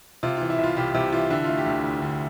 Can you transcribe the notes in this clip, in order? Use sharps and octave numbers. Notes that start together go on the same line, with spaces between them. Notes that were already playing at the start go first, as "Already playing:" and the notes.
C3 F4
F4
E3
E4
C2
F4
C2 G4
C3 G4
E3 F4
D3 E4
F4
A3
G4
D2
D2
D3